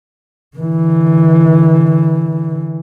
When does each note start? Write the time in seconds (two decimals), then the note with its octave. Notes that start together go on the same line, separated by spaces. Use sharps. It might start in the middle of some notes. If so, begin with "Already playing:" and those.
0.57 D3 E3